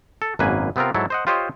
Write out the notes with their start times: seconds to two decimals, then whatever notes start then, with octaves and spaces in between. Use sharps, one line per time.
0.22 A4
0.39 G#1 F#2 B2 A#3 B4 G#5
0.76 C3 B3 C4 F4 A#4
0.94 G#2 F#3 E4 A4
1.10 C5 D#5 F#5
1.27 F4 G4 C5 C#5 D#5